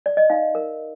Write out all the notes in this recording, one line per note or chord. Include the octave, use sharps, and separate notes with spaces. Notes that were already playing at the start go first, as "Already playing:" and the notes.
D5
D#5
D#4 F5
A#4